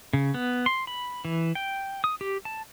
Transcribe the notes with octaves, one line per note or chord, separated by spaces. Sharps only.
C#3
B3
C6
B5
E3
G5
D#6
G4
A5